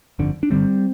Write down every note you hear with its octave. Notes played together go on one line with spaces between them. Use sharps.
G1 F2 D3
D4
G1 F2 D3 G3 C4